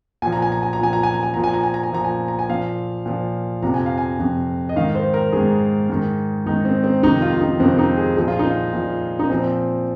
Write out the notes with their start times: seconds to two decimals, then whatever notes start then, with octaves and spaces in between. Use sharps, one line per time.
0.22 A#2 F3 G#5
0.32 A#5
0.42 G#5
0.52 A#5
0.63 G#5
0.73 A#5
0.79 A#2 F3 G#5
0.93 A#5
1.03 G#5
1.14 A#5
1.23 G#5
1.34 A#2 F3 A#5
1.44 G#5
1.54 A#5
1.63 G#5
1.74 A#5
1.83 G#5
1.92 A#2 F3 A#5
2.04 G#5
2.28 A#5
2.39 G#5
2.50 A#2 F3 F5
3.06 A#2 F3
3.62 F2 C3 F3 A#5
3.74 G#5
3.86 F5
3.98 G#5
4.19 F2 C3 F3
4.69 D#5
4.76 G#2 D#3 F5
4.95 C5
5.14 A#4
5.33 G#2 D#3 G#4
5.90 G#2 D#3
6.46 G#2 D#3 D#4
6.65 C4
6.84 C4
7.03 F2 C3 D#3 D#4
7.22 F4
7.33 F4
7.41 D#4
7.60 F2 C3 D#3 C4
7.79 D#4
7.97 G#4
8.16 A#2 F3 G#4
8.28 F4
8.39 D#4
8.50 F4
8.73 A#2 F3
9.19 D#4
9.30 A#2 F3 C4